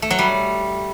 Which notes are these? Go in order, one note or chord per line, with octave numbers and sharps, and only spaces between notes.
A3
F#3
G3